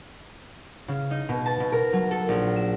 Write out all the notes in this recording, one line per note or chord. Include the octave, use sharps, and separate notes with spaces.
C#3
D#4
B2
A5
B2
A#4
F#3
A4
A#1
E7